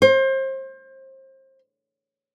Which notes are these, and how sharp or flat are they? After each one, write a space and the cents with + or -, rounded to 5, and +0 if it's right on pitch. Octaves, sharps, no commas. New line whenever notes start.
C5 +30